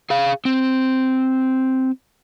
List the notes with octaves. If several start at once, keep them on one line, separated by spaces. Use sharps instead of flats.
G#4 F5
C4